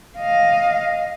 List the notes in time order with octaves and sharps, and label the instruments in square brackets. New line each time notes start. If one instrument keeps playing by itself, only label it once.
[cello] D#5 F5